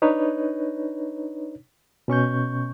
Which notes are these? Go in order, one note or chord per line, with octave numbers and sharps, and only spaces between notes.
D4 D#4 B4 C#5
B2 C#4 C#6 G6